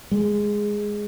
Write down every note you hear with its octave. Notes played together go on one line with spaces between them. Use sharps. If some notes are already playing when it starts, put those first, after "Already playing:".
G#3